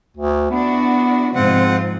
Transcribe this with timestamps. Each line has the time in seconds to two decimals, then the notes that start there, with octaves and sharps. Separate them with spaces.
0.17 D2
0.51 B3 D4 E4 F#4
1.35 G#2 C3 F3 C4 F4 F#5